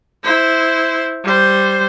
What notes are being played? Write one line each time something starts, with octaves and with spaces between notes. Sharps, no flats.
E4 C5
G3 C5